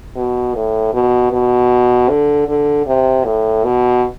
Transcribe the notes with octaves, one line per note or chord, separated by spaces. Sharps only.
B2
A2
B2
B2
D3
D3
C3
A2
B2